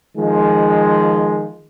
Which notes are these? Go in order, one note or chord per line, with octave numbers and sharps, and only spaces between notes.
D#3 F3 G#3